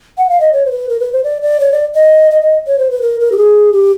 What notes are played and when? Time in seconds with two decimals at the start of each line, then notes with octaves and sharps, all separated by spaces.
0.18 F#5
0.29 F5
0.40 D#5
0.53 C#5
0.65 C5
0.71 B4
0.89 A#4
1.00 B4
1.13 C5
1.24 D5
1.42 D5
1.60 C#5
1.72 D5
1.95 D#5
2.31 D#5
2.42 D#5
2.67 C#5
2.78 C5
2.91 B4
3.02 A#4
3.20 A#4
3.32 G4
3.37 G#4
3.73 G4